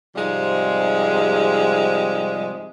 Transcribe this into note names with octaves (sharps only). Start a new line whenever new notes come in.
G#2 C3 F3 G3 G#3